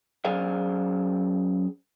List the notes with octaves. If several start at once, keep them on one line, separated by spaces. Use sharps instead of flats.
F#2 G#4 C5 D5 F5